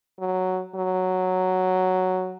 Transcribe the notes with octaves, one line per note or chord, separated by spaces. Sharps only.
F#3
F#3